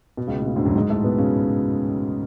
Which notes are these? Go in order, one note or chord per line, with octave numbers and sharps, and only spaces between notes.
B2
C#2 C#3
A2
B2
D2 D3
F#2 F#3
G#2 G#3
A2 A3
B2 B3
C#3 C#4